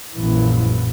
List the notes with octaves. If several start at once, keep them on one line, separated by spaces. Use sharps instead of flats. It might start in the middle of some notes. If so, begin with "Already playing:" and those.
A#1 F#2 A#2 E3